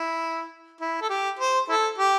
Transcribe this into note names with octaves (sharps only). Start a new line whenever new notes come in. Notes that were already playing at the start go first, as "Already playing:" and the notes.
Already playing: E4
E4
A4
G4
C5
E4 A4
G4